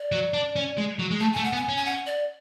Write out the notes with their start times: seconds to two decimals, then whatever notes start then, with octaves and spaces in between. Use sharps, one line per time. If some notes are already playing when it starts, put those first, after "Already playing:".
Already playing: D5
0.12 F#3
0.34 D4
0.56 C#4
0.77 G#3
0.99 F#3
1.10 G#3
1.20 A3 A5
1.32 A3 G#5
1.44 F#5
1.53 B3
1.56 G#5
1.69 C#4
1.77 G#5
1.85 F#5
2.06 D5